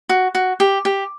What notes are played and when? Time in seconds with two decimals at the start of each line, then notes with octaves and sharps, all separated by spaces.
0.09 F#4
0.35 F#4
0.60 G4
0.85 G4